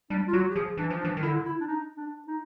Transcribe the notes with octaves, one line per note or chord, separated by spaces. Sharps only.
G3 D4
F4
F#3 F#4
G4
F3 G#4
E3 D4
F3
D4
E3
D#3
D3 E4
E4
D4
D#4
D4
D#4